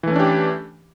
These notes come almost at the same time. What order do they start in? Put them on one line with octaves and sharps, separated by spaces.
E3 A3 C#4 D4 G4